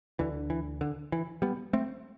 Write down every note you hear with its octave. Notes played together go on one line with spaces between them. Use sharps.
D2 D3 E3
E3
D3
E3
G3 B3
A3 C4